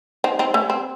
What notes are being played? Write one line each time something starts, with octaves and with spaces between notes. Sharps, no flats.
C4 D#4
C4 D#4
A3 C#4
C4